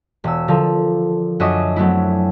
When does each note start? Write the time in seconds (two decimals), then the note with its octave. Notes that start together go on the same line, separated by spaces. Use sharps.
0.24 E1 E6
0.48 D3 F3 A4 A#4
1.40 F#2 D4 F#4 D#5 E5 D#6
1.76 F#3 A3 B3 C4 E4